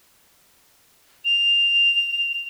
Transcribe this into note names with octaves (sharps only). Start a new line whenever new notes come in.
F7